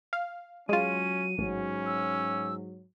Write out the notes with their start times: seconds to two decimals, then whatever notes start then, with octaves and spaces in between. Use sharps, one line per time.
0.13 F5
0.69 F#3 G#3 C#4 F4 D#7
1.38 A1 G#2 F#3 C#4
1.86 E6